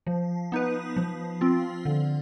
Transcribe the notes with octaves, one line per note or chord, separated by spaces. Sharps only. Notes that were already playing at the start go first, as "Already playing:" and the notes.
F3
B3 D#4 B4
F3
C4 F4
D3